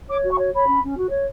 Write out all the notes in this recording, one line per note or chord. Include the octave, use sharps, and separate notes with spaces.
C#5 D6
F#4
C#6
C#5
C#5 B5
C#4
C#4
F#4
C#5